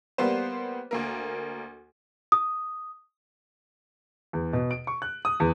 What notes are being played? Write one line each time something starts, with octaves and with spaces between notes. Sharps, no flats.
G3 A#3 B3 C5
D2 A#3 A#4
D#6
E2
B2
D7
C#6
F#6
D#6
E2